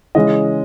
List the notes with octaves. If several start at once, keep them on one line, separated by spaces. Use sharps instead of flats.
C#3 E3 G#3 C#4 D#5